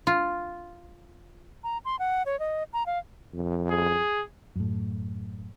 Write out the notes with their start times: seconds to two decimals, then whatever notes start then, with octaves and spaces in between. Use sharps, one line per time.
0.07 F4
1.64 A#5
1.85 C6
1.99 F#5
2.26 C#5
2.40 D#5
2.73 A#5
2.86 F5
3.34 F2
3.70 G#4
4.56 F#2 A2